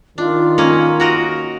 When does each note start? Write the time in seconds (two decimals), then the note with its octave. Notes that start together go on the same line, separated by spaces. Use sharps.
0.18 D#3 D4 F4
0.58 A#3 C#4 D#5
1.00 F#4 A#4 D#5